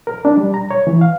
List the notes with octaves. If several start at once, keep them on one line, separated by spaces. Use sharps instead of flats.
A#4
D4
G3
A#5
C#5
E3
F5